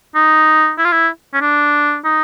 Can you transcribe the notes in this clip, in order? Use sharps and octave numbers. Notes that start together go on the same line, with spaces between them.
D#4
E4
F4
E4
C#4
D4
D#4